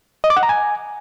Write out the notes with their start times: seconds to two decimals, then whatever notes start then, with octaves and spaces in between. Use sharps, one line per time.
0.24 D#5
0.30 D6
0.37 F#5
0.43 A#5
0.49 G#5